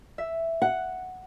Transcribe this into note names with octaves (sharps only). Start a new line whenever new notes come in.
E5
F#5